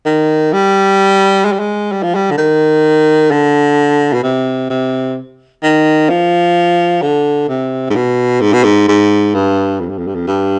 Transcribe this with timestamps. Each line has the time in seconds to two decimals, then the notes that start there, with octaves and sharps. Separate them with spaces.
0.06 D#3
0.53 G3
1.45 G#3
1.53 G3
1.60 G#3
1.92 G3
2.03 F3
2.15 G3
2.31 D3
2.38 D#3
3.31 D3
4.14 B2
4.24 C3
4.70 C3
5.63 D#3
6.10 F3
7.02 D3
7.49 C3
7.90 G#2
7.96 B2
8.41 G#2
8.53 B2
8.64 G#2
8.89 G#2
9.35 G2
9.81 F2
9.90 G2
9.98 F2
10.07 G2
10.15 F2
10.27 G2